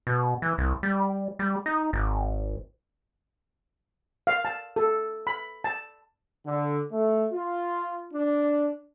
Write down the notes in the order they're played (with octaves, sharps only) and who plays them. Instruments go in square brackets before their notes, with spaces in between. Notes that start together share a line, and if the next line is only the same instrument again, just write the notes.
[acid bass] B2
E3
C2
G3
G3
D#4
G#1
[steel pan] F5
A5
A4
B5
A5
[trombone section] D3
A3
F4
D4